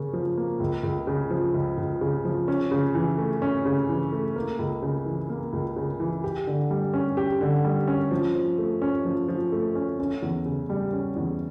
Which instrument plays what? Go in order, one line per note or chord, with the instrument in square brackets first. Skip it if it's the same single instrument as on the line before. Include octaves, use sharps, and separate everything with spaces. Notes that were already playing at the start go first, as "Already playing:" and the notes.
Already playing: [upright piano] C#3 A#3 C#4
F3
A#3
C#2
C#2
C#3
F3
C#2
C#2
C#3
F3
C#4
C#3
E3
A3
C#4
C#3
E3
A3
A#3
C#2
C#3
E3
A#3
C#2
C#3
E3
G4
D3
G3
C#4
G4
D3
G3
C#4
F3
F3
A3
C#4
F3
F3
A3
C#4
C#4
E2
C#3
G3
C#4
E2